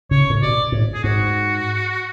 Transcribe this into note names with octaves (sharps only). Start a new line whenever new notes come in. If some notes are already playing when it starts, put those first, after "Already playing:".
C#3 C#5
A2
B2 D5
A2
G#4
G#2 F#4